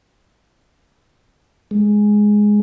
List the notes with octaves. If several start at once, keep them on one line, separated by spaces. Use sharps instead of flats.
G#3